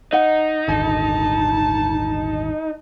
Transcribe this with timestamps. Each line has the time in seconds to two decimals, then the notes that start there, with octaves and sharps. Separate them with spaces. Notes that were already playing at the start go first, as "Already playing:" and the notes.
0.13 D#4 D#5 F#5
0.68 D#1 G#1 D3 A5